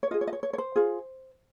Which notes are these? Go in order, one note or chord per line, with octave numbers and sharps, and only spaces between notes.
C#5
F4 G#4 D#5
C#5
D#5
C#5
C#5
C#5
C5
F4 G#4